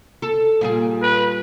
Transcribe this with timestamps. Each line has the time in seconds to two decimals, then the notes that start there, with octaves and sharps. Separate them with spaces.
0.22 A4
0.61 A#2 G3 G#4
1.02 B4